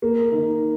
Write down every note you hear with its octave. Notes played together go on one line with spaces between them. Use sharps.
A#3
D#3